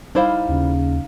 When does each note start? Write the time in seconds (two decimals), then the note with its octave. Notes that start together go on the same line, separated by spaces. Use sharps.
0.15 G3 D#4 E4 C5 F5
0.49 D#2 C#3